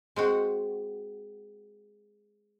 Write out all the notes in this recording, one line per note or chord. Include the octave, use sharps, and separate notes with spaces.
G#3 C4 F#4